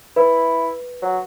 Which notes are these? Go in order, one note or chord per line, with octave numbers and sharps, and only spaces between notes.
E4 B4
F#3